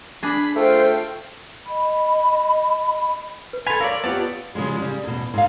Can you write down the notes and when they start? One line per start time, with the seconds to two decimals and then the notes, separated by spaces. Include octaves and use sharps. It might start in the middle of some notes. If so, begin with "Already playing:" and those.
0.23 D4 G#4 B5 B6
0.56 A3 F4 C5 G5
1.68 D#5 B5
3.53 B4
3.67 A4 G#5 B5 C6 G#6 B6 F7
3.81 A#4 C#5 D5 F5 E6
4.04 B3 F4 G4 C#5 D5 A5
4.55 C#3 F3 G3 G#3
4.78 C#3 G3
5.03 E2 B2
5.34 G#2 F5